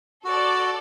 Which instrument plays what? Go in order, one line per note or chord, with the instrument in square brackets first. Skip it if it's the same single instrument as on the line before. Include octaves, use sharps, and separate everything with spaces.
[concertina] F#4 [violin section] A4 D5